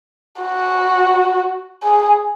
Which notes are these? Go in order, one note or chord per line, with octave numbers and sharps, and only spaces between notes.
F#4
G#4